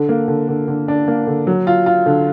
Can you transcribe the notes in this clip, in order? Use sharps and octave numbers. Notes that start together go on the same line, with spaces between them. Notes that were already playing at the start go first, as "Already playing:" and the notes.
Already playing: D3
A#3
D3
D3
D3
D4
A#3
D3
F#3
F4
F4
D3